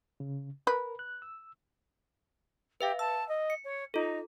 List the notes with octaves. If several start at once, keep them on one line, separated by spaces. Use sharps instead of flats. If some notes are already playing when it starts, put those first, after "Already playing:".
C#3
A#4 B4
F#6
E6
G4 B4 E5 F5
A5 E6
D#5
C#7
C#5
D#4 F4 A4